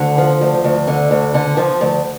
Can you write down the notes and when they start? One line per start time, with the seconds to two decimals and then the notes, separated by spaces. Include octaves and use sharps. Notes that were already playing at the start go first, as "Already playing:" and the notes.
Already playing: D2 D3
0.18 F3
0.41 D2
0.64 D2
0.87 D3
1.11 D2
1.34 D3
1.57 F3
1.81 D2